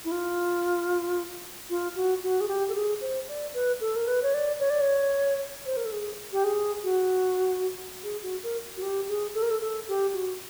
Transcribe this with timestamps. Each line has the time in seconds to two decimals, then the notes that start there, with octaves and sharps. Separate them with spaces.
0.05 E4
0.12 F4
1.70 F4
1.96 F#4
2.23 F#4
2.41 G#4
2.48 G4
2.69 A4
2.75 G#4
3.01 C5
3.28 D5
3.54 B4
3.81 A4
3.96 A#4
4.08 B4
4.23 C#5
4.34 D5
4.59 C#5
4.70 D5
4.81 C#5
5.66 C5
5.77 A#4
5.85 A4
5.92 G#4
6.32 G4
6.44 G#4
6.84 F#4
8.03 G#4
8.23 F#4
8.43 A#4
8.77 F#4
8.82 G4
9.09 G#4
9.35 A4
9.42 A#4
9.50 A4
9.61 A4
9.88 G4
10.14 F#4